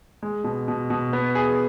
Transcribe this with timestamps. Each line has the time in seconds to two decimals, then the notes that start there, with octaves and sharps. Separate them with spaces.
0.23 G#3
0.44 B2
0.68 B2
0.90 B2
1.13 B3
1.35 G#4